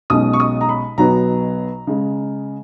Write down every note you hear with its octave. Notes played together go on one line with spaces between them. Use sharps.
B1 B2 G#3 C#4 D#6
C#6
D#6
A#5
B5
B1 B2 F#3 B3 A#5
C#3 G#3